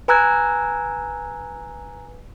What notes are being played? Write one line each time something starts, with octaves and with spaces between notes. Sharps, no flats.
B4 G#5 A#5 E6 F#6 G#6